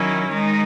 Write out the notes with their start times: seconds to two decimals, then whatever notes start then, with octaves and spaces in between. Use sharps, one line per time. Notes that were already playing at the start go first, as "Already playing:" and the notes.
Already playing: D#3 F#3 C#4 E4
0.29 D#3 G#3 D#4